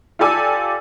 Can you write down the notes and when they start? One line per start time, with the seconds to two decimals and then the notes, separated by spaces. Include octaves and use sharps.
0.19 F4 G4 A4 D5 G#5 E6